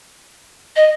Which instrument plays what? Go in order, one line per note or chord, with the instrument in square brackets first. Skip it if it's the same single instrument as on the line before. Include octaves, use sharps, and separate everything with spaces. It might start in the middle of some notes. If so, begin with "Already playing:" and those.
[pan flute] D#5